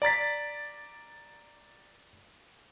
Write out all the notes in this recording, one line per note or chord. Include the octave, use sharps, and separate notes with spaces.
D5 A#5 A6 B6